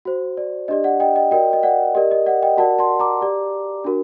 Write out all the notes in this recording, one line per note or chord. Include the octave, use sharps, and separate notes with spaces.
F#4 C5
D5
D4 G4 D5 D#5
D5 F#5
D#5 G5
D#5 G5
F#4 A#4 D5 D#5 G5
D#5
D5 F#5
G4 A#4 D5 D#5
D#5
D5 F#5
D#5 G5
F#4 A#4 D5 F#5 A5
A5 C6
A#5 D6
G4 D5
D4 F#4 A#4